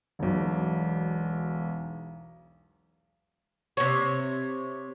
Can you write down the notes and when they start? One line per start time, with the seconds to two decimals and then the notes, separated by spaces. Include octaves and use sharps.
0.19 E1 B1
3.77 C3 C#5